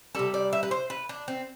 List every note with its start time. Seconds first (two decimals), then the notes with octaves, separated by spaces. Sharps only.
0.15 C3 G3 A4
0.34 D5
0.53 E5
0.63 B4
0.71 C5
0.90 B4
1.09 D4
1.28 C4